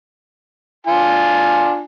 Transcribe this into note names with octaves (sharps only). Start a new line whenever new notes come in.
D4 F4 G#5